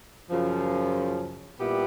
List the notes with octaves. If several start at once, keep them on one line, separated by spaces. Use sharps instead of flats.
F#2 C#3 F3
A#2 G3 B3 E4 G4